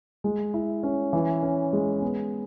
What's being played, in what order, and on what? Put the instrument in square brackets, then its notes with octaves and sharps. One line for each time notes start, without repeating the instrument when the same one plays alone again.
[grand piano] G#3
E4
C#4
E3
C#4
G#3
B3